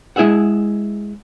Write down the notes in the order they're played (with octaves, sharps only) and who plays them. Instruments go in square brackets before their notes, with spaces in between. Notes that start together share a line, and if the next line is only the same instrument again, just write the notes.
[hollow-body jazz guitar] G#3 E4 G#4 E5 F#5